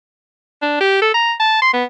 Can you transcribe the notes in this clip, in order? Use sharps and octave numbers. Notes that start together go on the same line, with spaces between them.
D4
G4
A4
A#5
A5
C6
B3